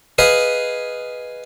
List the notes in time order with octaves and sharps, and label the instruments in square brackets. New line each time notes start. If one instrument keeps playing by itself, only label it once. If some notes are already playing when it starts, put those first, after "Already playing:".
[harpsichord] G#4 B4 D#5 F5